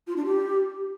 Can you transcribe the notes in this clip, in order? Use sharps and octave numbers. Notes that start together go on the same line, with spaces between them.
F4
D4
G4